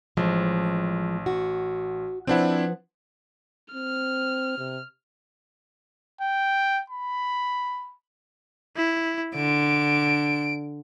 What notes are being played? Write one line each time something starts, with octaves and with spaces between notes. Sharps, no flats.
A1 F3 G#3
F#4
F3 C4 D4 E4 B4 F#5
C4 F6
C3
G5
B5
E4
D3 D7